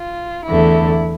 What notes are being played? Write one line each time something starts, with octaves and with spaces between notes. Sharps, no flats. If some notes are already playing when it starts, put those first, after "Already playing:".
Already playing: F4
E2 D3 A3 E4